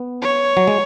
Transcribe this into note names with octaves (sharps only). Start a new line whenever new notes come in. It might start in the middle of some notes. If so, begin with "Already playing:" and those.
Already playing: B3
C#5
F#3
G#3